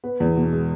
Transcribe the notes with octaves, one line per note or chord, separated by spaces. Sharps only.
B3
E2
B2
G#3